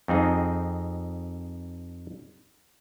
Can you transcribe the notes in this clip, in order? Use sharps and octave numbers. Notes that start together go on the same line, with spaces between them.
F2 C4 D#4 G#4